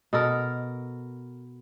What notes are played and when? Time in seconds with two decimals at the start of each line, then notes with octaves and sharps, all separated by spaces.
0.13 B2 A4 A#4